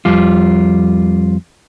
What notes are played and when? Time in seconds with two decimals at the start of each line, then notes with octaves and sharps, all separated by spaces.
0.05 F2 G3 F4